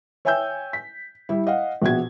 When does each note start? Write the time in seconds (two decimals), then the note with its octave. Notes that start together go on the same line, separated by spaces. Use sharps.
0.25 C#5 E5 G5 G#5 E6 G6
0.73 B6
1.29 G3 E4
1.47 D#5 F5 F#5
1.82 A#1 B2 F#4 G#6